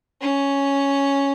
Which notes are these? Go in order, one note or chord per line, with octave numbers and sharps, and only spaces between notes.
C#4